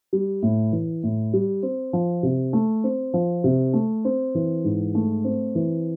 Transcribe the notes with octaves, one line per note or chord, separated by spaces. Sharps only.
G3
A2
E3
A2
G3
C4
F3
C3
A3
C4
F3
C3
A3
C4
E3
G#2
A3
C4
E3